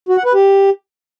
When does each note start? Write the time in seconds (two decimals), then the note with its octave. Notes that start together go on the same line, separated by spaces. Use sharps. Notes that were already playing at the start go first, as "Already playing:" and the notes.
0.09 F#4
0.17 F#5
0.25 B4
0.34 G4